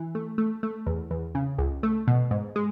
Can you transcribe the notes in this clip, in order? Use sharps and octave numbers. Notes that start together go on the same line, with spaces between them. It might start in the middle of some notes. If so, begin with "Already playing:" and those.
Already playing: E3
A3
A3
A3
E2
E2
C#3
C#2
A3
B2
G#2
G#3